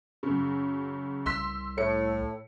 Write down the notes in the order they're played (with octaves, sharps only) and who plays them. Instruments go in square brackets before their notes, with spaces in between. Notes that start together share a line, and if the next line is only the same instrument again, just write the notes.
[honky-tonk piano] F#2 C#3
[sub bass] C2 [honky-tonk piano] C6 E6 B6
[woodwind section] A2 [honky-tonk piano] C#7